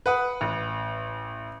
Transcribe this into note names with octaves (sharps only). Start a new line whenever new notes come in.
B4 F#5 D#6
A1